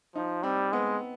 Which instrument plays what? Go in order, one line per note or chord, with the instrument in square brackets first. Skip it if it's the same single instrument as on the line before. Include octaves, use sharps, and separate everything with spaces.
[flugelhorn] F3 [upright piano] D#4
[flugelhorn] G3 [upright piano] C4
[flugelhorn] G#3 [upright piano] B3